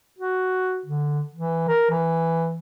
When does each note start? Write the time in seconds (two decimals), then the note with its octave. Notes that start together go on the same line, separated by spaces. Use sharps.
0.19 F#4
0.86 D3
1.33 E3
1.68 A#4
1.90 E3